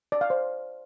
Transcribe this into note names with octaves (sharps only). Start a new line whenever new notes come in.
D5
F5
C5